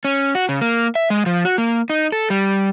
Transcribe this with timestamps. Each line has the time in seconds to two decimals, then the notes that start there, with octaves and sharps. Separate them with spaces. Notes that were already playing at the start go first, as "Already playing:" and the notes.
0.05 C#4
0.35 F#4
0.49 C#3
0.61 A#3
0.95 E5
1.10 G#3
1.26 F3
1.45 F#4
1.58 A#3
1.90 D#4
2.12 A4
2.30 G3